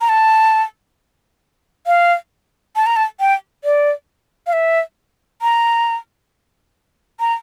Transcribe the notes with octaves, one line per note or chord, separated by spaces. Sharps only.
A#5
A5
F5
A5
A#5
A5
G5
D5
F5
E5
A#5
A#5